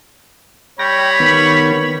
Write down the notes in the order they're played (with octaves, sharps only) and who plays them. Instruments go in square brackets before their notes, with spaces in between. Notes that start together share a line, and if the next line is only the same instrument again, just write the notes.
[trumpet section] G3 B5 [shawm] C#5 [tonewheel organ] G5 A#6
[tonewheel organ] D#3 B3